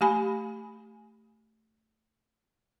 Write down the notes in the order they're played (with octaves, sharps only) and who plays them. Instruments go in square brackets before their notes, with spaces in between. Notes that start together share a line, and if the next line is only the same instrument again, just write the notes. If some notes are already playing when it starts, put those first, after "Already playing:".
[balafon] A3 G4 G#5 B5